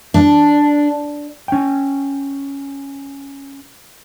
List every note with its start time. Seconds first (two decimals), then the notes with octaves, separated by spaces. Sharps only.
0.14 D4
1.48 C#4 G5